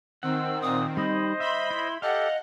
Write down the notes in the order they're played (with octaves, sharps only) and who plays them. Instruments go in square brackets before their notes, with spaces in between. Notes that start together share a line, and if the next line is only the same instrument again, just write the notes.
[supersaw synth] D#3 C4 [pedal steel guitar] F#5 [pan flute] E6
[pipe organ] A#2 [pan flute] D#6
[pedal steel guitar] G3 D#4 [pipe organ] C5 D#5 [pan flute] B5
[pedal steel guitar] E5 [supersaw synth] B5 [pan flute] C6
[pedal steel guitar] E4
[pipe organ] G4 A4 [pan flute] D#5 [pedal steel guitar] F5 [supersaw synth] F#5